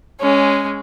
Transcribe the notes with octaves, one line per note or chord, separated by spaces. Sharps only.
G#3 C#4